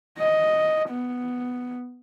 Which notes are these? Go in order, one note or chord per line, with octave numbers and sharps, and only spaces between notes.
D#5
B3